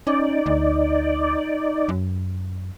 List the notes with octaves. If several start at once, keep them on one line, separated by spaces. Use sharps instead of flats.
C#4 D#4 D5
D2
F#2